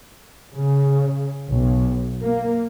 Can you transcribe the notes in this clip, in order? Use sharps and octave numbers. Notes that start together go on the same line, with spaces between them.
C#3
B1
A#3